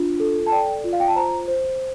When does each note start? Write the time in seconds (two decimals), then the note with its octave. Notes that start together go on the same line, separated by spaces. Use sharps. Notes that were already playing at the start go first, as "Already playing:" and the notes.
Already playing: D4 F4
0.20 A4
0.46 A5
0.52 D5 G5
0.84 F4
0.93 F5
1.00 G5
1.08 A5
1.16 C5 A#5
1.48 C5